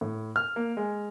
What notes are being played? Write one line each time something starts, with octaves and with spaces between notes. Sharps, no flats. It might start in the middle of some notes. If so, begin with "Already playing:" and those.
A2
F6
A#3
G#3